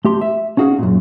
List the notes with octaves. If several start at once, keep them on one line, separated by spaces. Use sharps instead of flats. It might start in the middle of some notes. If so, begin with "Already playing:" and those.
A3 G4 C6
E5
C#4 D#4 F#4 G#4 F5
F#2 A#2